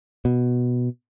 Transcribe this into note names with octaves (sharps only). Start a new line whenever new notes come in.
B2